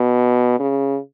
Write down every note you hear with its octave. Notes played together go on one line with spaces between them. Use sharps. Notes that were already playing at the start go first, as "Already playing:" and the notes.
Already playing: B2
C#3